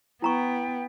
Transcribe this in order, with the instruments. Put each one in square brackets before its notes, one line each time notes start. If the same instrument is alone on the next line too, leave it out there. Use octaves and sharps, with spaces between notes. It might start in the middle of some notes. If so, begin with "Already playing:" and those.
[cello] B3 [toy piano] E4 A#5 C#6 [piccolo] G5